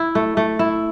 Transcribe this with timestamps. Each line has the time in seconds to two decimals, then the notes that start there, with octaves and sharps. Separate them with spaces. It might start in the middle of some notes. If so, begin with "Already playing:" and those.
Already playing: E4
0.15 A3
0.37 A3
0.59 E4